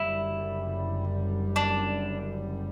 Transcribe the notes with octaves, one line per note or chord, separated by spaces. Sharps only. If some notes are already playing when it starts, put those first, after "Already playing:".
Already playing: F#1 F#2 D3 G3 E4
D4